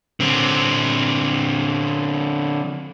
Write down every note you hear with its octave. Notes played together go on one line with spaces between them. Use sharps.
D3 C4